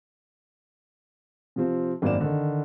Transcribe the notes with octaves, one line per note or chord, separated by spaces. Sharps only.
C3 F3 C4 F4
G#1 F#2 A#3 D5 E7
D3 D#3